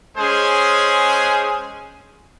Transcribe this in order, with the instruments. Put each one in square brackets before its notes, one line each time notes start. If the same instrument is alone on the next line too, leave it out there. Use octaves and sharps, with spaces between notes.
[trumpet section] G#3 C#4 G#4 C5